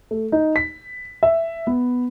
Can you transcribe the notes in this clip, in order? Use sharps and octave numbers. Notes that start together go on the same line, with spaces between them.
A3
D#4
B6
E5
B3